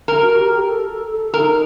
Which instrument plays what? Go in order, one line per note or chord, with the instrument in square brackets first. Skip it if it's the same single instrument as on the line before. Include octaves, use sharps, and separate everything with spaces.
[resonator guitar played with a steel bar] A#4
[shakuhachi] F#4
F#4
G4
A#4
A4
A4
[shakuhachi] D#4 [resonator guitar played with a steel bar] A#4